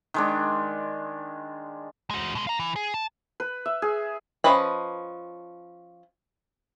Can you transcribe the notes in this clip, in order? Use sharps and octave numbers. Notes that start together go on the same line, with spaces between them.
D#3 G#3 D4
G#3 F#4
B2 G#3
F5 A#5
E3
G#4
A5
B4
E5
G#4
F3 C#4 B4 D#5 B5